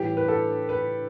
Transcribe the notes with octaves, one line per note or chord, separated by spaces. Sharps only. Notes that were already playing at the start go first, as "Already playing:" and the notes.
Already playing: A2 E3 G3 G4
B4
A4
B4